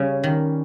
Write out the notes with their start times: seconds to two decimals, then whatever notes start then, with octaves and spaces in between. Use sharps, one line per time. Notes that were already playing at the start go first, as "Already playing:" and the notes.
Already playing: C#3 G3 C#4
0.24 D#3